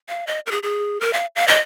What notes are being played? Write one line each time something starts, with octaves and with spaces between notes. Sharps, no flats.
F5
D#5
A#4
G#4
G#4
A#4
F5
F5
D#5